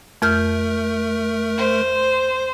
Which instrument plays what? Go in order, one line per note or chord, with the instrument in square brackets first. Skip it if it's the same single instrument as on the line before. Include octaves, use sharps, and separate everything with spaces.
[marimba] F2 F6 G6 [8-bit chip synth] A3 A#4
[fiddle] C5